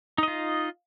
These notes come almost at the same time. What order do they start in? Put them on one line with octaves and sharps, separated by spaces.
D#4 D#5 F4